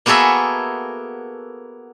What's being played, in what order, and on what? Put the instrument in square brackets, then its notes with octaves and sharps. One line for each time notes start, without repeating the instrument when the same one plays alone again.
[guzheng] A#3 B3 F#4 G#4 A4 E5